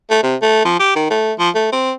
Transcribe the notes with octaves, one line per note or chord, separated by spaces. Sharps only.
A3
C3
A3
F3
G4
D#3
A3
F3
A3
C4